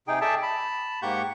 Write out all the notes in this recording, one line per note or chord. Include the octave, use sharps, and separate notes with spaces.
C3 D#4 G#4 G5
G#4 A4 D5 E5 G5 A5
A5 B5
G#2 A#3 G4 F#5 C#6 G6